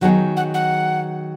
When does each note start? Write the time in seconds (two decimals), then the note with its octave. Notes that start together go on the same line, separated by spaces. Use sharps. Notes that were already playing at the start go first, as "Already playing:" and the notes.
0.01 D#3 F#3 B3 D#4 G#4 F#5
0.37 F#5
0.54 F#5